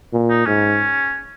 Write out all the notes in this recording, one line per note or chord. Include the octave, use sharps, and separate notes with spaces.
A#2
D#4
G#2 C#4